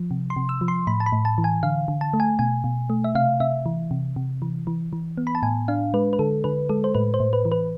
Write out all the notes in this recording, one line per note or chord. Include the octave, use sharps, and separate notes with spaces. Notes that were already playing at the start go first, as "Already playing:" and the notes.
Already playing: F3
C3
C6
C3
E6
F3
C6
A2 B5
A5
B5
A2
A5
E3
G#5
D3 F5
D3
A5
A3
G#5
B2 G#5
B2
A3
E5
C3 F5
C3 E5
E3
C3
C3
E3
E3
E3
B3
B5
A5
A2 G#5
D4 F5
G#3 B4
B4
D3 A4
D3 B4
G#3 A4
C5
A2 B4
C5
A2
B4
E3
B4